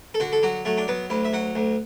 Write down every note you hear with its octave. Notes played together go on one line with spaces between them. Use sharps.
A4
D3 F#4
A4
F#3 F#4
F#3 A3
D4
F#3 B3
D2 E4
E5
F#3 F#5
D2